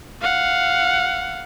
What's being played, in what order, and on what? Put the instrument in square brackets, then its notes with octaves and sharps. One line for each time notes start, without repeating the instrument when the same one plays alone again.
[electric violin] F5 F#5